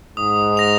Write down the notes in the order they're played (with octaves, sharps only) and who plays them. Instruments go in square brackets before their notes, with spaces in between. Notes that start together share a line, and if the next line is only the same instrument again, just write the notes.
[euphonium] G#2 [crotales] D#6
[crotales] A#6 F7